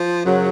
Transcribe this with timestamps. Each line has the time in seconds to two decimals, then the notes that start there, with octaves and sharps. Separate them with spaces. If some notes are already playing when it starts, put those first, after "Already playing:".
Already playing: F3
0.24 F#2 C#3 F#3